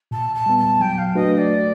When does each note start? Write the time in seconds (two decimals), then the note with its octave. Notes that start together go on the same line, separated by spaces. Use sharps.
0.11 A#2 A5
0.34 A5
0.46 G3 B3
0.58 A5
0.80 F#3 G5
0.98 F5
1.15 A3 D4 F#4 B4 D#5
1.32 D#5
1.37 D5
1.50 A3